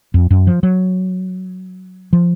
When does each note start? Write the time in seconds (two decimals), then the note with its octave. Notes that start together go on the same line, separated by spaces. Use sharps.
0.14 F2
0.30 F#2
0.47 F3
0.63 F#3
2.13 F3